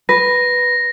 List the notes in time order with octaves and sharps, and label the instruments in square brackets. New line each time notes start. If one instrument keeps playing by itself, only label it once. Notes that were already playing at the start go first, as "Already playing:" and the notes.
[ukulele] B4 [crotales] A#6